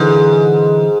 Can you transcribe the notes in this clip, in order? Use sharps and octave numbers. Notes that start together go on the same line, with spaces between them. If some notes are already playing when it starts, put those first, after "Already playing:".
Already playing: G#2 D3 E3